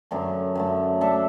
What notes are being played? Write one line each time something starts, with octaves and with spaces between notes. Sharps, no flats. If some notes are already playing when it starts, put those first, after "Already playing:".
F#2 D3 A3
F#2 D3 A3
A3 D4 A4 E5